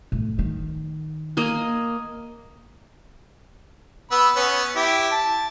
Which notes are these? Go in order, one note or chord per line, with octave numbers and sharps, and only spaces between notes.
A2
D#3
A#3 D#5 G#5
B3 B5 E6
B3 C#4
E4 G4
A5